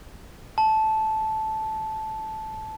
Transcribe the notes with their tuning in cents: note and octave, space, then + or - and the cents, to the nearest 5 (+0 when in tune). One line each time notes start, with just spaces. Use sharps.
A5 -10